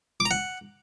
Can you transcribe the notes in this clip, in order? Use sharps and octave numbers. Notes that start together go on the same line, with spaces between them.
D6
A#5
F#5